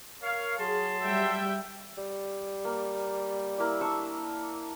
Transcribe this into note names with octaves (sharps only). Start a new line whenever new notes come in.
A#4 C#5 F5
F#3 G#4 A5 C6
G3 E5 G5
G3
A#3
A#3 E4 D5
D4 C#6 E6